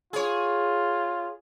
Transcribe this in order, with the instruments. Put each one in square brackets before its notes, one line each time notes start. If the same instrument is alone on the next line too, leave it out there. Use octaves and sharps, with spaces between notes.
[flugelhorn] F4 [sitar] G#4 C#5